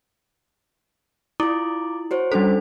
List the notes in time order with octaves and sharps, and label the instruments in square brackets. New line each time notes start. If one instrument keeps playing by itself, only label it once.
[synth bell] E4 [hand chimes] F4 D6
[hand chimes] F#4 C5 C#5
[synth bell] G3 C5 [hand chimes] C#4 D4 A4